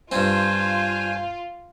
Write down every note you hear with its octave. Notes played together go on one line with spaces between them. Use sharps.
G2 C4 F4 C5 G#5